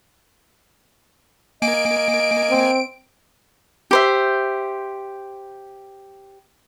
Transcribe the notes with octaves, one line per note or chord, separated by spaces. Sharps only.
A#3 D#5 G#5 D7
C4
G4 C5 E5